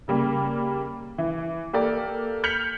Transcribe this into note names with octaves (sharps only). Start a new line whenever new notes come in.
C#3 G3 A#3
E3
A#3 G4 A4 D5
F6 G6 B6 C#7 F7 F#7